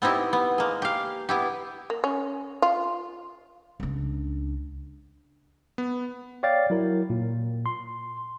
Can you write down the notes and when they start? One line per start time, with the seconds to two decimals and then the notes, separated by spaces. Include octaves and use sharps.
0.02 B3 C4 D#4 E4 G4
0.33 B3
0.58 G#3 A#3
0.82 G4 F5
1.29 B3 E4 G4
1.90 A#3
2.04 C#4
2.62 F4
3.80 C#2 D4
5.78 B3
6.43 C#5 D5 F5 G5 A6
6.70 F#3 E4 A#4
7.10 A#2
7.66 C6